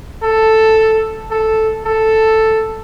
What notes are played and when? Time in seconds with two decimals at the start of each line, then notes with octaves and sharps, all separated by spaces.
0.23 A4
1.31 A4
1.85 A4